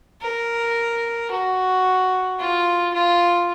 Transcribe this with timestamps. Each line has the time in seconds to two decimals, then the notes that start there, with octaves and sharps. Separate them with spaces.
0.21 A#4
1.31 F#4
2.39 F4
2.94 F4